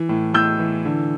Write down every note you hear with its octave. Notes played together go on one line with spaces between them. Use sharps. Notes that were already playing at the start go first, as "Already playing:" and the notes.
Already playing: E3
A2
A2 E6 G6
E3
D3